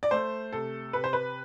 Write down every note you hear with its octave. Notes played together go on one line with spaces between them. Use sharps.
D5
A3 C5
C3 A4
C3 B4
C5
B4